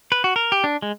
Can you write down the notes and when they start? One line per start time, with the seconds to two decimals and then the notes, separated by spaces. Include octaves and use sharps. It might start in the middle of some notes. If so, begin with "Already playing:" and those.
0.12 B4
0.24 F#4
0.36 A#4
0.52 G4
0.64 D4
0.82 G#3